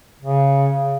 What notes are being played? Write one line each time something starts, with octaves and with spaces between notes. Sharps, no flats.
C#3